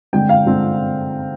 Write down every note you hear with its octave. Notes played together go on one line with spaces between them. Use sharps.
D3 G#3 C4 G5
F5
D3 G#3 C4